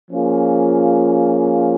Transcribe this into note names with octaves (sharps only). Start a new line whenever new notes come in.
F3 A#3 C#4 F4 G#4